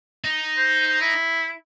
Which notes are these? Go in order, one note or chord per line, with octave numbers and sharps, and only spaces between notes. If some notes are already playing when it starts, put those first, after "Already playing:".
D#4
C5
E4